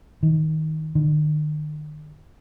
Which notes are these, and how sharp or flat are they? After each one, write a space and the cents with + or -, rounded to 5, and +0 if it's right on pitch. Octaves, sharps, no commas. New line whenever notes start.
D#3 +15
D#3 -45